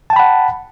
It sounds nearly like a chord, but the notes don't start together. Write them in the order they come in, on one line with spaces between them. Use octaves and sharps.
A5 G5 B5 F#5